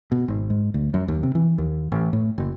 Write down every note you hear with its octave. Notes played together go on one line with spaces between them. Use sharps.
B2
G#1
G#2
D2
F#2
D#2
C3
E3
D#2
A1
A2
F#1